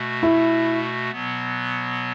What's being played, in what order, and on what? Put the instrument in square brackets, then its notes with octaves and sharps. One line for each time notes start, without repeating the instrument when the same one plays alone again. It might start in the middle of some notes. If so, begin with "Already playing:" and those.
Already playing: [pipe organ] B2 A3 F#4
[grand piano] E4
[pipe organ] B2 F#3 B3